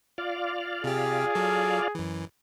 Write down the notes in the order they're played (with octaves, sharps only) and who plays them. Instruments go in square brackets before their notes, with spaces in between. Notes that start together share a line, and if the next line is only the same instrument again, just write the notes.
[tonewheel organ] F4 D5 F5
[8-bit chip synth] C3 G4 [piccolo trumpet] G#4
[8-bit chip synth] F#3 A4
F#2 E3